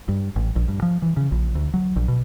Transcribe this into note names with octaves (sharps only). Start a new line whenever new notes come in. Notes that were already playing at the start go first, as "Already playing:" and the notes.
G2
A1
A#1
G2
F3
E3
C#3
A#1
D2
F#3
A#1
B2